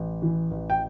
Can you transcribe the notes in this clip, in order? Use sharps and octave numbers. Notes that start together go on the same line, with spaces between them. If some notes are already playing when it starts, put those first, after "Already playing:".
Already playing: A1
E3
A1
G5